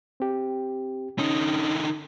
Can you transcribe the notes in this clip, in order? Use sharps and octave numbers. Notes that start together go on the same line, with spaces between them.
C4 G4
D3 C#4 D#4